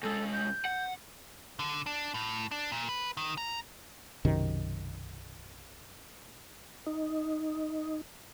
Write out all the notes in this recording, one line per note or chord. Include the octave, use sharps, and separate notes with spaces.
C2 G#3 A4
G6
F#5
D3
D4
A2
D4
A#2
B4
D#3
A#5
B1 F#2 C3 D#3
D#4